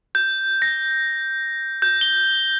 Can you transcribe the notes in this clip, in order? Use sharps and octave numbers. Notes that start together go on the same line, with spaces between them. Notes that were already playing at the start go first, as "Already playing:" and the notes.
G6
A#6
G6
G7